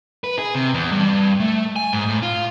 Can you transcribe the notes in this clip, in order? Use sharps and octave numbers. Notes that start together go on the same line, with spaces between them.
B4
G#4
C3
E2
G2
A3
G#5
G#2
A2
F4